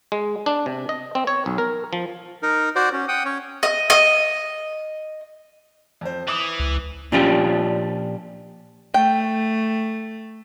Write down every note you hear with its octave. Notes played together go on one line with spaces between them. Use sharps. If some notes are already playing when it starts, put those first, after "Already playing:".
G#3
D4
C3
D#5
C4
C#5
B1
A#4
F3
D#4 A#4
F#4 C5 D5
C#4
F#5 G5 D#6
C#4 C#5
D#5
D#5
F2 C5
E3 D6 D#6
C#2
A#2 F3 C#4 D4 F4 G4
A3 G5